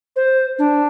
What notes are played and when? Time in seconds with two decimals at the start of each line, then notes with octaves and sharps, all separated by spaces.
0.16 C5
0.59 D4